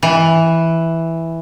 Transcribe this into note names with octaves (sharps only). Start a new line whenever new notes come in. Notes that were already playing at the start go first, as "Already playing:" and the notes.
E3